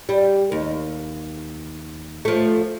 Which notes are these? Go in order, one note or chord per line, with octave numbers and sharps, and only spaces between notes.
G3
D#2
F3 A3